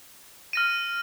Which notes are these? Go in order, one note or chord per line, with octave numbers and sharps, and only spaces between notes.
F6 A#6 D#7